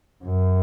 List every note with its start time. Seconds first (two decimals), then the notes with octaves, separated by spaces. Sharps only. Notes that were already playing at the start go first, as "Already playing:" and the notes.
0.24 F#2